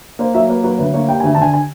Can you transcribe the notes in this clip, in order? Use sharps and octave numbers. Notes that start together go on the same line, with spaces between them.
A#3 C5
F#3 E5
A#3 B4
F#3 B4
D2 B4
A#3 C#5
G3 G5
G#5
D2
A5
D3 G#5
G#5